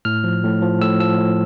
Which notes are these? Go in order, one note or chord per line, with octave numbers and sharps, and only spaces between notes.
A2 F6
F3
A2
F3
A2 E6
F3 E6
A2